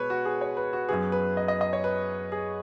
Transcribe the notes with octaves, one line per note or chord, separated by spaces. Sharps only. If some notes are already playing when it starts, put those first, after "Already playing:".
Already playing: B2 G#3 B4 C#5
F#4
G#4
C#5
B4
F#4
F#2 F#3 B3 G#4
B4
D#5
D#5
D#5
C#5
B4
G#4